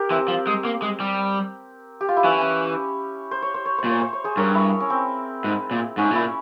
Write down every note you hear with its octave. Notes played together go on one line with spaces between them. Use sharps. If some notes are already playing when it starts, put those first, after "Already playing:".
Already playing: G4 A#4
E3 C4
F3
G#3
A#3
G#3
G3
G4
F4
E4
E3 C#4
C#4
C5
C#5
C5
C#5
C5
A#2
C#5
C5
C#5
G#4 C5
G2 A#4 C#5
E4
C#4
C4
G#2
A#2
G#2 C#4
A#2 E4